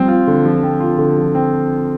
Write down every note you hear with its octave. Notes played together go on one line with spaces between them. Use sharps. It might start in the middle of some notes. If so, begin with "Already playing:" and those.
Already playing: F3 G3 C4
F4
D3
F3
C4
F4
D3
F3
C4